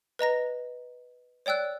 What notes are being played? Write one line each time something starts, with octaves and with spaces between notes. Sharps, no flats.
B4 D#5 A#5 A#6
C#5 D5 G5 E6 F#6